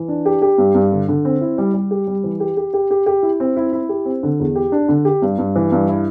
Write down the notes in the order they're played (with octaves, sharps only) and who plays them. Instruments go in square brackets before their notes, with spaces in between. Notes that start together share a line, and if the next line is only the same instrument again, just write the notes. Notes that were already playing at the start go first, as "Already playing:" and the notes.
Already playing: [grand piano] E3
D4
G4
G4
G2
G2
D3
D3
C4
E4
G3
G3
G4
G3
E3
G4
G4
G4
G4
G4
E4
C4
E4
E4
G4
C4
D3
E2
G4
D4
D3
G4
G2
G2
E3
G2
E4